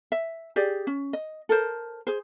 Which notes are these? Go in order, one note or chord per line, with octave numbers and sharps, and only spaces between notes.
E5
G4 G#4 D5
C#4
D#5
A4 A#4 C5
G#4 C5